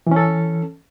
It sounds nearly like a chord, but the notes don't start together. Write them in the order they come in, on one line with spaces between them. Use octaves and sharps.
E3 C#4 A4